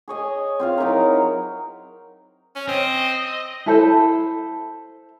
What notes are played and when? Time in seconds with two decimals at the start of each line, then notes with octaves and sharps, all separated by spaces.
0.08 G#4 C#5 D#5 G#5
0.60 C4 F4 F5
0.78 F#3 D#4 E4 A#4
2.56 C#4
2.69 C4 D#5
3.66 E4 A4 C5 A5